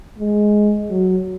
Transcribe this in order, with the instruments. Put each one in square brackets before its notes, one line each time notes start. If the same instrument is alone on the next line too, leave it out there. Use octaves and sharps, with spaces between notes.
[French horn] G#3
F#3